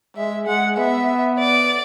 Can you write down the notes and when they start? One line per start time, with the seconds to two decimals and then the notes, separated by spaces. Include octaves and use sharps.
0.16 G#3 E5
0.47 G#3 F#5
0.77 B3 E5
1.38 D5